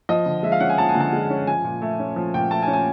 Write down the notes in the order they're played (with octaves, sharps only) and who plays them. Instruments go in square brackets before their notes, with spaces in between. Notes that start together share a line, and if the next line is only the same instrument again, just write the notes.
[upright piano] F3 D#5
D3
G#3 E5
F5
C#4 F#5
G#5
F3 A5
G#5
D3
A5
G#3
C#4
F3 G#5
A#2
A3
C#4
F3
A#2 G5
A3 A5
G#5
C#4
G#5